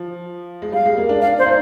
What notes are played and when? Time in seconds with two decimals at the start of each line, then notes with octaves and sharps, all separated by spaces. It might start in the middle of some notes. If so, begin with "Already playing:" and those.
Already playing: F3
0.62 G#3
0.72 G3 F5
0.86 G#3
0.97 A#3
1.09 D4
1.22 D4 F5
1.39 C5
1.42 D4
1.46 D#4